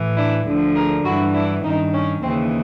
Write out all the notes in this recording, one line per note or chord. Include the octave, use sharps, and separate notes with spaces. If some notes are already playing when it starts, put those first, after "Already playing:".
Already playing: A2 E3
D4 E4
D2 D3 F3
G#4 A#4
G2 E3 E4 F#4
D4 E4
G2 D#3 C#4 D#4
C#4
D#2 C#3 E3 C4